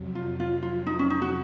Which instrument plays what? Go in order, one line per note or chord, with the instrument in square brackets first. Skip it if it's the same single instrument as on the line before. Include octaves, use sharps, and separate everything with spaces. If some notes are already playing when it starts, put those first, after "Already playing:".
Already playing: [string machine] F2 C3 F#3
[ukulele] F4
F4
F4
D#4
C#4
D#4
F#4